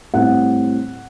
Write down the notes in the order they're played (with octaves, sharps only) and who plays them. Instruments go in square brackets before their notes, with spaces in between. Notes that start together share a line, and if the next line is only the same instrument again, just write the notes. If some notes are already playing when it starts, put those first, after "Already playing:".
[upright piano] A2 G3 C4 F#5